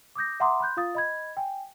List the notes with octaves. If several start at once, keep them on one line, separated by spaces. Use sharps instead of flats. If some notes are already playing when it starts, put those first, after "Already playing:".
D6 D#6 G6 A#6
E5 F#5 A#5 C6 D6 D#6
B5 C6 F#6 G6
F4 F5 D#6 A6
D#5 B5 G#6
G5 G#5